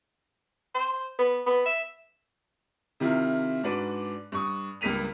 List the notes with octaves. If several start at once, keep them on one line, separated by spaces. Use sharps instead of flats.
C5
B3
B3
E5
C3 D#3 E4 F4
G#2 D4 F#4 B4 D6
G2 C#6 D#6
C#2 G2 A#3 B6 D#7 F7